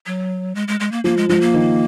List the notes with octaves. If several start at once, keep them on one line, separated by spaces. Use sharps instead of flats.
F#3
G#3
G#3
G#3
A#3
F3 A#3
G#3
F3 G#3
A#3
D#3